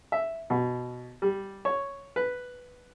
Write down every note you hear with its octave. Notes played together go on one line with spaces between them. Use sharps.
E5
B2
G3
C#5
B4